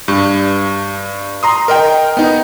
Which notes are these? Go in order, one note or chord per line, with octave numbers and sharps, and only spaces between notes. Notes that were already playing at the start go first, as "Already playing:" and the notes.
G2
A#5 C6 D#6
A#4 D#5 G5
B3 D#4